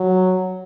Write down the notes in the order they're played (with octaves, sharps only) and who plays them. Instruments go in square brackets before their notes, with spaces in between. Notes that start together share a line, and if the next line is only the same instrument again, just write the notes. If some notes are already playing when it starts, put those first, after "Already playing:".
Already playing: [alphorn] F#3